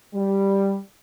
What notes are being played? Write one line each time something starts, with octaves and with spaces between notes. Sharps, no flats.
G3